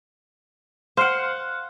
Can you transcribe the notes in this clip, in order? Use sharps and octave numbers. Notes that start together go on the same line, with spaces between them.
C5 F5 F#5